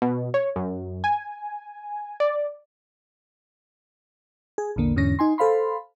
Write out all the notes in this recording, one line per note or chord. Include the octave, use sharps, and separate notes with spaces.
B2
C#5
F#2
G#5
D5
G#4
A#1 E2 D3 A#3
E2 G#2 D3 C#4 A#6
D#4 G#5 C6
A4 C5 F5 B5 C6